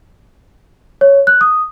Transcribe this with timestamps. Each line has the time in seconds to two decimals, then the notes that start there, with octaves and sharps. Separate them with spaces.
1.01 C#5
1.27 F#6
1.41 D#6